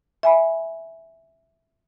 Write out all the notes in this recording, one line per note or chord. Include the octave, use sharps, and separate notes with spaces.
E5 G#5 B5